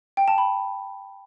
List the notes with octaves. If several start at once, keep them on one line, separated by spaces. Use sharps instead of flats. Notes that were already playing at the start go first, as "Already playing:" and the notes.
G5
A5
B5